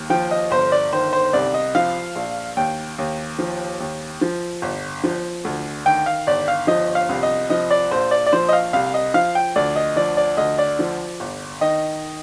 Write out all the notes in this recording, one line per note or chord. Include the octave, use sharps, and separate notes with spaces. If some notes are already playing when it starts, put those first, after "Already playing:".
Already playing: D#2
F3 G5
D#5
G1 C5
D5
D#3 C5
C5
C2 D5
D#5
F3 F5
A#1
D#2 G5
D#2
F3
D#2
F3
G1
F3
D2
D#3 G5
F5
G1 D5
F5
F3 D#5
F5
C2
D#5
F3 D#5
D5
A#1 C5
D5
D5
F3 C5
D#5
F5
C2 F5
D#5
F3 F5
G5
D2 D5
D#5
F3 D5
D5
D2 D#5
D5
F3
G1
D#3 D#5